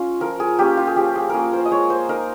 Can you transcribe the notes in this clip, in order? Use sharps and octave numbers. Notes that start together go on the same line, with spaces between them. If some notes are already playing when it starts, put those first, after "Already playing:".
Already playing: G#3 C#4 F4
F3 A#4
G#4
A#3 C#4 G4
F4
G#4
F3 G4
G#4
A#3 C#4 G#4 A#4
C5
D#5
G#3 C#5
C5
D#4 A#4